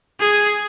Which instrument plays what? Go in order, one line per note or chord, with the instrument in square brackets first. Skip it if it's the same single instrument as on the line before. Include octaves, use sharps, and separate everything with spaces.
[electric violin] G#4